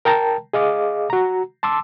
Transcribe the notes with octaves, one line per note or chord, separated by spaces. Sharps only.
A#4 G5 A5 A#5
G#4 D#5 F5 D6
F#4 A#5
A5 C6 D6 E6